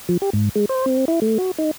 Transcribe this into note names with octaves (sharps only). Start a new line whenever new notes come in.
F3
G4
G#2
G#3
C5
C4
E4
A3
F#4
D#4